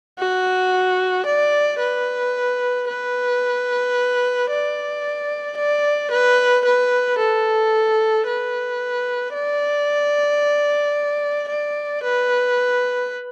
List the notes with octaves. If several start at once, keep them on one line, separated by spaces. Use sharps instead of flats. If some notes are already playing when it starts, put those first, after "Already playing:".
F#4
D5
B4
B4
D5
D5
B4
B4
A4
B4
D5
D5
B4